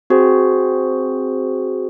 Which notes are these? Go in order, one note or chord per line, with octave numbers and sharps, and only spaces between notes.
C4 F#4 G#4 C5